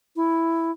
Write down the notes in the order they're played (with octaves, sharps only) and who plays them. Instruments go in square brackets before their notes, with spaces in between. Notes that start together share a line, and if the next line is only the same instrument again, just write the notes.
[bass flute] E4